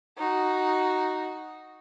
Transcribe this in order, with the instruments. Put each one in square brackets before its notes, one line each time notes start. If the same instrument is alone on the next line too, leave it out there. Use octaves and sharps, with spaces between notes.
[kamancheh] D#4 F#4